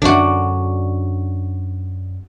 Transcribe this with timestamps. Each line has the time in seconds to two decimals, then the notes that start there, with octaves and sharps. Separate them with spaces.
0.02 F#2 D3 D4 F#4